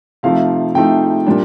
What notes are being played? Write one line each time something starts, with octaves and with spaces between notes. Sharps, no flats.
C3 F3 A3 D#4 F5
C3 F3 A3 D#4 G5
A#2 G3 D4